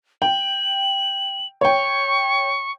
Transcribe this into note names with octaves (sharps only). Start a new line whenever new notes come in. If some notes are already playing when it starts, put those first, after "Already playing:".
G5 F#7
C#5 G5 C#6